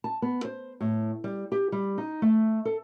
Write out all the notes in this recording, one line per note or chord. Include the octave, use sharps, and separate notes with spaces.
A5
B3
C5
A2
G3
G4
G3
D#4
A3
A4